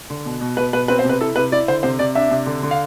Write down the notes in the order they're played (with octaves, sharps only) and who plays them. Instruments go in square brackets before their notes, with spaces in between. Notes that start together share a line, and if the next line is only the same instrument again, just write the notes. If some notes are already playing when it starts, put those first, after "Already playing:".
[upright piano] D3
B2
B2
[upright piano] B2 [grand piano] B4
[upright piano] B2 [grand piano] B4
[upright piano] C4 [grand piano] B4
[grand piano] C5
[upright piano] C3
[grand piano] B4
[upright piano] E4 [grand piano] A4
[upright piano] C3 [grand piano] B4
[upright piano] E4 [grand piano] D5
[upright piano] D3 [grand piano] C5
[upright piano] C3 [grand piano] C5
[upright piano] C3 [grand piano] D5
[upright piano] D4 [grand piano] E5
[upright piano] C3
D3
D3
[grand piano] F5